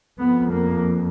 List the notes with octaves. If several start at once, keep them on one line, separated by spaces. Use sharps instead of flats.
F2 B3
A#3